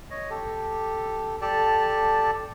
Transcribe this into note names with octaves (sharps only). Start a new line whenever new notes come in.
C#5 D#5
G4 A4
G4 A4 D5 A5